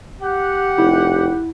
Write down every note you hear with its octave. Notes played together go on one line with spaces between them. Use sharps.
G4 F#5
F1 E4